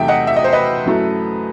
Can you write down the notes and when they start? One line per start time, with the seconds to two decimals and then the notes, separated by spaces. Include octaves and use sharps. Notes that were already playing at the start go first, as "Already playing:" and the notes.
Already playing: E2 C3 F#3 A3 D#4 E5 G5
0.08 D#5 F#5
0.27 E5
0.36 D#5
0.44 C5
0.53 B4 D#5
0.86 F#2 F#3 A3 E4